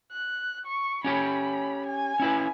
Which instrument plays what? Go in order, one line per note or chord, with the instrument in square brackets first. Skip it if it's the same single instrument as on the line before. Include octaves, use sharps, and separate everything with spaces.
[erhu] F#6
C#6
[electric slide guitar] C#4 G4 C#5 [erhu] B5
[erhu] G#5
[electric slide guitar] C#4 E4 B4